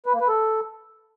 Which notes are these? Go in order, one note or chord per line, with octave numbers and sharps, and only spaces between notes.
B4
A#3
B4
A4